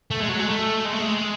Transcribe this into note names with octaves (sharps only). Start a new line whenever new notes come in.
A3
G#3
F#3
G#3
A3
G#3
A3
G#3